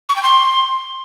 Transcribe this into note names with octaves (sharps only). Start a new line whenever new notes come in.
C#6
G5
C6